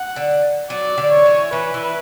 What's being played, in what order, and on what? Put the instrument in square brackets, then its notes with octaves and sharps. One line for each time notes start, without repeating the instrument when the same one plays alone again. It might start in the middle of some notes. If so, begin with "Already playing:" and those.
Already playing: [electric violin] F#5
[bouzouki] D3
[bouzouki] F#3 [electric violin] D5
[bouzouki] D3
[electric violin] C#5
[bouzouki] E3
[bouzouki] E3 [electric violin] B4
[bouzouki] E3